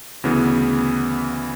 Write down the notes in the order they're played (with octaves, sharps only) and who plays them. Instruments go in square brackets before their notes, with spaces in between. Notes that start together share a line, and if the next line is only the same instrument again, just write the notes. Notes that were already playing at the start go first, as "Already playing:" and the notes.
[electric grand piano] D2 C#3 E3 B3